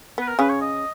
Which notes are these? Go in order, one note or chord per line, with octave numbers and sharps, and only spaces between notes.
B3 B4
A#4
C#3 C#4 B4
C#5
D#5